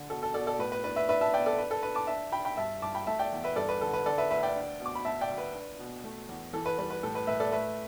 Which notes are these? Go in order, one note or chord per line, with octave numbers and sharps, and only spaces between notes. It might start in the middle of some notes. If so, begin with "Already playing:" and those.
Already playing: D3
B2 A4
A4
B2 A4 D5
A4 D5
A2 B4
B4
D4 B4
B4 E5
D4 B4 E5
E5 A5
B3 D5 G5
A4 D5
D4 B4
A4
D4 B4
A5 D6
D4 E5 A5
D4 G5 B5
G5 B5
G2 E5 A5
G2 A5 D6
G5 B5
A3 E5 A5
D5 G5
E2
B4 E5
G2 A4 D5
B4
D3 A4
B4
D3 A4 D5
B4 E5
D2 B4 E5
D5 G5
D4
B2
D6
B5
D2 E5 A5
D5 G5
D2
B4
D4
B2
A3
E2
E3 A4
B4
G3 B4
B4
A2 A4
B4
A2 B4 E5
A4 D5
A3 B4 E5